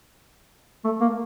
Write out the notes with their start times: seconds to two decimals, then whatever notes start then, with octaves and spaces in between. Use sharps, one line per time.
0.84 A3
1.01 A#3